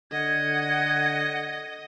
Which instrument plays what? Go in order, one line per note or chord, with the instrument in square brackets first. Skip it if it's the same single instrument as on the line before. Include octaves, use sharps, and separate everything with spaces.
[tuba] D3 [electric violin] D#5 [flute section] F#5 [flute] G#6